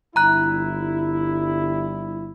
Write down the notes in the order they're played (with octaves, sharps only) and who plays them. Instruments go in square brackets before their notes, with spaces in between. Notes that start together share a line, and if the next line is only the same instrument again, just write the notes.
[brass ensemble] G1 G3 E4 [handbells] A#5 F#6